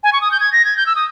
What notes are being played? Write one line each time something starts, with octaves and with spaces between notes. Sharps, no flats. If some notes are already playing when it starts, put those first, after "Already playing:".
G#5
C#6
D#6
G6
G#6
A#6
G#6
G6
E6
D#6